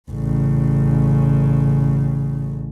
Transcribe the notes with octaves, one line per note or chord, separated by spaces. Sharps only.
A1 C#3